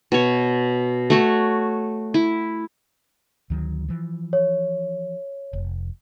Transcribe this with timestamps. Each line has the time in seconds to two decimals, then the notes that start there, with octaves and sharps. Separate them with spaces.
0.12 B2 C#5
1.10 A3 F#4 C#5
2.14 E4
3.50 D2 D#3 F#3
3.88 E3 F3
4.33 C#5
5.53 F1